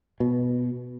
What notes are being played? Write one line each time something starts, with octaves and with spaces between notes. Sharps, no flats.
B2